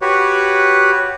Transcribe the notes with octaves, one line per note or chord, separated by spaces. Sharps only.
F#4 G4 B4 C#5